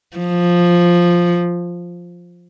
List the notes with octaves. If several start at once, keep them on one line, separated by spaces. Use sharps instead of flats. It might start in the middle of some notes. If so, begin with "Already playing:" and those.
F3